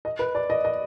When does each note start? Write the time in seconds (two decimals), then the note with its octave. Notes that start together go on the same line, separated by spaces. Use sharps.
0.05 D#5
0.19 B4
0.35 D5
0.50 D#5
0.65 D#5